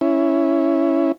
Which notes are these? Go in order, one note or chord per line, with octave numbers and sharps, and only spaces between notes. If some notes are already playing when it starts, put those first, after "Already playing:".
C#4 E4